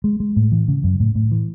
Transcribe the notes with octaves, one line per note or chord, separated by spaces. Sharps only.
G#3
G#3
A2
E3
C#3
F#2
A2
A2
E3